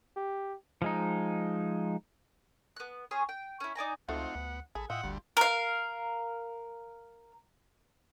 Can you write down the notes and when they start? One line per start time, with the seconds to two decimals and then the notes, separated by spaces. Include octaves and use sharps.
0.17 G4
0.82 F3 G#3 D#4
2.76 B3 F#6
3.11 C#4 G#4 C#5 C6
3.29 G5
3.60 C#4 E4
3.75 D#4 D5 G#5 A#5
4.09 C#2 F3 A3 C4 D#4 F4 F#4 F#5
4.35 D2 B3
4.75 A1 G#4 A4 B5
4.90 A2 F4 D#5 E5 F#5 G5
5.03 G1 D2 G3
5.37 A#4 F5